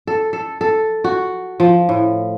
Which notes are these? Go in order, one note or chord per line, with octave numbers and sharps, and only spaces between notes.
A4
A4
A4
F#4
F3
A2